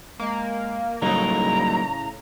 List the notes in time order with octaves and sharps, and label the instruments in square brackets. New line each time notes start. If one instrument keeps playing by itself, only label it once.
[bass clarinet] G#3 [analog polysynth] A#3
[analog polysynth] A2 C#3 [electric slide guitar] F#3 A#3 D#4 [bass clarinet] G3 [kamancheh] A#5